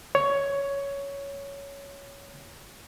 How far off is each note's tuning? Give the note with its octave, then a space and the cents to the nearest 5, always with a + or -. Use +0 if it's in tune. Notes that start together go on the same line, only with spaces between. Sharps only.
C#5 +10